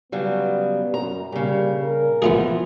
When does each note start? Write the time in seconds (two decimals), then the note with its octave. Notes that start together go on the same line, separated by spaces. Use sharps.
0.12 C#3 F#3 G3 B3
0.94 F#2 A#5
1.32 A#2 C#3 G3
1.82 A#4
2.22 E3 F3 B3 F4 G#4